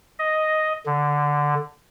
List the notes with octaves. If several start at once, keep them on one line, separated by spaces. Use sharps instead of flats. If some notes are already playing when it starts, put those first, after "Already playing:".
D#5
D3